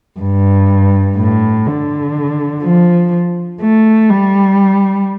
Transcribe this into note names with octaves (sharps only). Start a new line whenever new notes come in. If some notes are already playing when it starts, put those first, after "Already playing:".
G2
A2
D3
F3
A3
G3